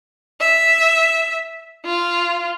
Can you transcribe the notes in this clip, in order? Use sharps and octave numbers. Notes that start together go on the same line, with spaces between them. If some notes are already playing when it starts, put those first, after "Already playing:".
E5
F4